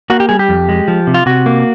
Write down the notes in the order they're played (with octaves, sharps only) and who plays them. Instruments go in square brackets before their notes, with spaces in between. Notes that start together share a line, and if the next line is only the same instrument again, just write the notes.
[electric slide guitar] A#3 F#4
G4
G3 G#4
G4
F2
G#3
F3
C3
F4
C3 F#4
A#3